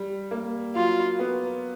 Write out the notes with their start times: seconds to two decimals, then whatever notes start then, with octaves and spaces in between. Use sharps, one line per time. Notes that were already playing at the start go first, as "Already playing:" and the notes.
Already playing: G3
0.31 A#3
0.75 F#3 F4
1.19 B3